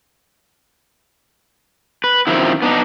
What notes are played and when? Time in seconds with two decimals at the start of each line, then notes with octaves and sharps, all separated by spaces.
2.04 B4
2.27 F#2 A2 D#3 F3 C4 E4
2.62 B3 D4 D#4